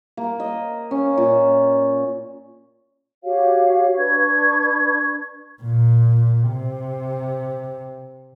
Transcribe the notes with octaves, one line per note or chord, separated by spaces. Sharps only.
A#3
D#5
C#4
A#2
F#4 G4 C#5 F5
D4 B4 C#6 G#6
A#2
C3